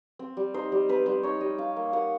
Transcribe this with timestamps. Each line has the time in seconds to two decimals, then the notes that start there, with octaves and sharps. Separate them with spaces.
0.19 C4
0.37 G3
0.54 D#4 C5
0.72 G3
0.89 C4 B4
1.06 G3 C5
1.23 D#4 C#5
1.41 G3 D#5
1.58 D#4 F5
1.76 A#3
1.93 A#3 F#5